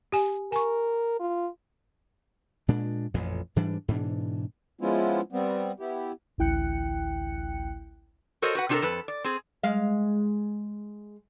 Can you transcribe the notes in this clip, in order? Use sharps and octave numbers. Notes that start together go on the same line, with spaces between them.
G4 G#5
A#4 G#5 C#6
F4
A#2 G#3 D4
A1 F2 A#2
G#2 E3 G3 D4
G#2 B2 E3 D4
F3 G#3 B3 C#4 E4 F4
G3 B3 C4
B3 E4 G4
A1 D2 E4 G5 F#6 C#7
F#4 A4 A#4 C5 C#5 D#5
F#4 B4 F#5
C3 D4 F#4 G4 A4 A#4
F2 A4 B4
D5
C4 G#4
G#3 F5